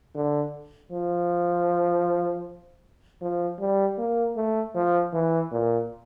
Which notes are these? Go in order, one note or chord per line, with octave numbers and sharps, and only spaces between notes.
D3
F3
F3
G3
A#3
A3
F3
E3
A#2